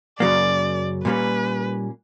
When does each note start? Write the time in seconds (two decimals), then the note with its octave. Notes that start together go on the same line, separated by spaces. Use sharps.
0.20 F#2 C#3 F#3 A#3 D5
1.05 A#2 G3 A#3 C#4 B4